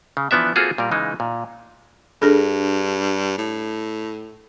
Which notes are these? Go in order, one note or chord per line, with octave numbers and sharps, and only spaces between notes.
C#3
E3 F3 B3 D4 E5
A#3 C4 F4 F#4 G#4 A4
A#2 G3 A#4
C#3 E3 G#3 D#4
A#2
G2 D4 G#4 A4
A2